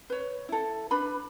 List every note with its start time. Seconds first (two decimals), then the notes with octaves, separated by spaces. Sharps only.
0.10 B4 C#5
0.49 E4 A4
0.91 D4 B4 B5